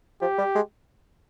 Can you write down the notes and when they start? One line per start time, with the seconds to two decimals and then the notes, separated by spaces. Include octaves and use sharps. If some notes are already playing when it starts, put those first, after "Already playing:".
0.21 F3 G4
0.38 G3
0.56 G#3